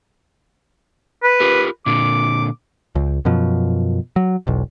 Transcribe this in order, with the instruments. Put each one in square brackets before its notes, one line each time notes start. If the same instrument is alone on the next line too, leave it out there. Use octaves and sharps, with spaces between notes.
[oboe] B4
[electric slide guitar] F4 G4 A#4
[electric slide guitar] A#2 D3 [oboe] D6
[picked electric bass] C#2
F#2 B2 F3
F#3
E1 B1